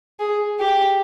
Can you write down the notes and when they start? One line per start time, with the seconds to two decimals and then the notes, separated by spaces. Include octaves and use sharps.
0.20 G#4
0.60 G4